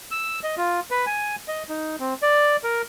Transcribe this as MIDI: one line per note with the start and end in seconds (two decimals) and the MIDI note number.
0.11 0.40 88
0.43 0.55 75
0.57 0.80 65
0.91 1.05 71
1.06 1.36 80
1.48 1.63 75
1.69 1.96 63
2.00 2.14 60
2.22 2.57 74
2.64 2.82 70